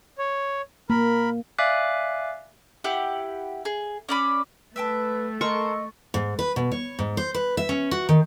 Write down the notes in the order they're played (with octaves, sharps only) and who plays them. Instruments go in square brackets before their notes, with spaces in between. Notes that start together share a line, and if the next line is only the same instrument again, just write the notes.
[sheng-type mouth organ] C#5
[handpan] A#3 [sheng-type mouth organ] A#4 B5
[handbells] D5 E5 F5 G#5 D6 F#6
[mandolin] E4 G4 F#5
G#4
C#4 D5 B5
[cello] A3 [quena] B4 [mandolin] E5 G5 A5
[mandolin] A4 A#4 C5 [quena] D#5 [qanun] C#6
[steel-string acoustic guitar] G#2
B4
B2
C#5
G#2
C5
B4
E5
C#4
F#4
D#3